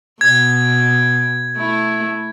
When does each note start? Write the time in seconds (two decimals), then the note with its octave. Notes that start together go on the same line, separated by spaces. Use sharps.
0.21 B2 G#6
1.57 A3 E4